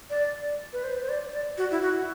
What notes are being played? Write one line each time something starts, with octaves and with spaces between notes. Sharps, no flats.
D5
B4
C5
C5
D5
D5
F#4
E4
F#4